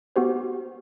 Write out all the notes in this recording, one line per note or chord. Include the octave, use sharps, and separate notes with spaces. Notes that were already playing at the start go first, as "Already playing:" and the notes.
B3 F#4 G4 C5